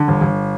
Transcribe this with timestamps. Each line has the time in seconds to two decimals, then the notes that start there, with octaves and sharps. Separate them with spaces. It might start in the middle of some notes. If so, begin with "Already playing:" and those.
Already playing: D3
0.08 G1
0.21 G1